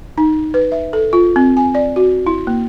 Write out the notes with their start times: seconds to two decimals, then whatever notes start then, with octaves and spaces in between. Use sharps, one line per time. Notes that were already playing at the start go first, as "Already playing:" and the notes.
0.18 D#4
0.54 B4
0.72 E5
0.93 A4
1.13 F4
1.36 C4
1.57 G#5
1.75 D5
1.96 F#4
2.27 E4
2.47 A#3